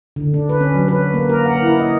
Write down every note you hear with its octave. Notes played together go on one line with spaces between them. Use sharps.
D3
D4
B4
C#4
F#3
B4
A#3
A#4
F#5
E4
D#5